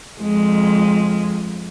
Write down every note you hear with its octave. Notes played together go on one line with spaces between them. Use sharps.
F2 G#3